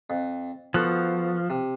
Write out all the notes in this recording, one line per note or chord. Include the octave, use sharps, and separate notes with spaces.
F2
F3 B3 F#4 A4
C3